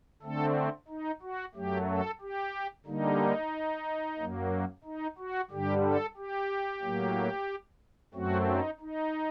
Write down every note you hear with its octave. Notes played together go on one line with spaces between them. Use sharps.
D3 A3 C4 A4
D#4
F#4
F#2 F#3 A3 G4
A4
G4
D3 G3 A#3 D#4
F#2 F#3 A#3
D#4
F#4
G2 D3 G3 G4
A4
G4
A2 F#3 A#3
F#2 F#3 A3 C4 F#4
D#4
D#4